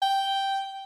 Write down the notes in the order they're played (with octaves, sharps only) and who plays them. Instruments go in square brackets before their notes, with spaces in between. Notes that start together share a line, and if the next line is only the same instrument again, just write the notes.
[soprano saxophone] G5